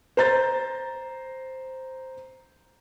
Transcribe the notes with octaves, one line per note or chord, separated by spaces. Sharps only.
C5 A#5 G6 A6